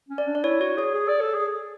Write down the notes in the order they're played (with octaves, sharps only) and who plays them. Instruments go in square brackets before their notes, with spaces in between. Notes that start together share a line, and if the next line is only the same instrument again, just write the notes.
[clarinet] C#4
[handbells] D5
[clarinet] D4
[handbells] D5
[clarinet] E4 [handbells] C#5
[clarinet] F#4 [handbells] C#5
[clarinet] G#4 [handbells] C#5
[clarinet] G#4
D5
A4
G#4